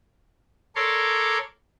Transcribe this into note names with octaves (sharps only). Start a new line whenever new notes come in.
A4 A#4 C#5 D5 C6 D6